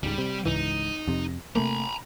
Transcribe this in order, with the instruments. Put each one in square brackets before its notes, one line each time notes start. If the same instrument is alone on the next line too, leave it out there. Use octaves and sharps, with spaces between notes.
[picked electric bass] C#2 G#2 [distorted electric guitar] G3
[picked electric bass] C3
[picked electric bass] C#2 G#2 E3 [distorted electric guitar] D#4
[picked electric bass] F2 C3
[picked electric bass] C3 A3 A#3 [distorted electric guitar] A#5 B5